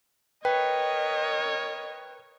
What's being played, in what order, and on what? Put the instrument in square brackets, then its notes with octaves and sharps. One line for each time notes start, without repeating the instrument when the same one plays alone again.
[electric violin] A#4 C#5 [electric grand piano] B4 [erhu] D#5 [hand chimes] G5